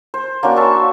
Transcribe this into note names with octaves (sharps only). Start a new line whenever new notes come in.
C5
A#3 C#4 D4 F#4
C5 E5 A5 C#6